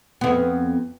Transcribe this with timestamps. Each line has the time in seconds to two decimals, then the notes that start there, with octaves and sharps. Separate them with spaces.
0.21 F2 B3